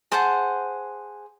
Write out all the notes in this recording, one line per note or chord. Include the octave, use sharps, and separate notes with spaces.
G#4 C5 F#5 A5